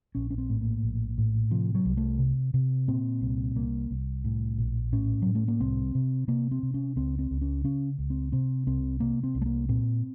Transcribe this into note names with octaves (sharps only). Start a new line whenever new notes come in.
A#1 C#4
C#4
C4
A2
A#3
A#1
A2
C3 F3
F#3
C2
A3
C3
C3
A#2 C4
C2
C2 A#3
C2
A2
A#1
A2 C#4
A2 F#3
A3
A#3
C2 C4
C3
C3 A#3
C4
C3
C#4
C#2 C4
C4
C#2
C#4
C#3 C#4
C#2
C4
C3 C4
C2 C4
C3 A#3
C4
C2
A3
A#3
A#2 C4